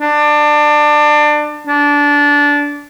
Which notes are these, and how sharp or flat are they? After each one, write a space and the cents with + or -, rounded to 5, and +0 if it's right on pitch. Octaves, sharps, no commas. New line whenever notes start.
D4 +25
D4 -20